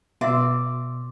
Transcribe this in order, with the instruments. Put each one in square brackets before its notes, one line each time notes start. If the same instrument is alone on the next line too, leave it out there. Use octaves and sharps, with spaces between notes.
[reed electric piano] B2 C6 E6 [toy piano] F#4 E5 [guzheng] D5